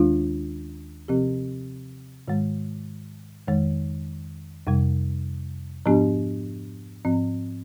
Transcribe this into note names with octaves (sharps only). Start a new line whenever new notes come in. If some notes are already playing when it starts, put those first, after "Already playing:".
Already playing: D#2 D#3 G#3 D4 F4
C3 F3 C4 G4
G#2 D#3 G#3
F2 D#3 G#3
F2 C3 G3
G#2 F3 B3 D4 G4
G#2 F3 C4